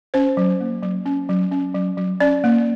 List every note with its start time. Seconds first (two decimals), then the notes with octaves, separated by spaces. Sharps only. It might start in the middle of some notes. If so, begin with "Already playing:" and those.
0.14 C#4 C5
0.37 F#3
0.60 A#3
0.83 F#3
1.06 C#4
1.29 F#3
1.52 C#4
1.75 F#3
1.97 F#3
2.20 C#4 D5
2.44 A#3